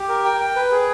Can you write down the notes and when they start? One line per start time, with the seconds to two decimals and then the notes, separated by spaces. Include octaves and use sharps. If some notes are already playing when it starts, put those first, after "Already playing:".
Already playing: G4
0.09 A#4
0.25 G5
0.40 G5
0.56 B4
0.71 G#4